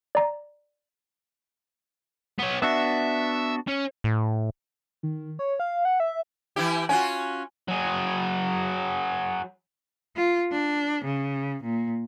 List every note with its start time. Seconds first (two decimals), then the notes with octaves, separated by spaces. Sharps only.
0.15 D5 A#5
2.39 B3 C#5
2.62 B3 D4 F#4 E5
3.67 C#4
4.04 A2
5.03 D#3
5.39 C#5
5.60 F5
5.85 F#5
6.00 E5
6.56 E3 E4 G4
6.89 C#4 F4 F#4 G#5
7.68 F#3 G#4
10.16 F4
10.52 D4
11.05 C#3
11.63 A#2